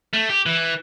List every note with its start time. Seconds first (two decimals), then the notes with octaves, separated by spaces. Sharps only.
0.13 A3
0.29 G4
0.46 E3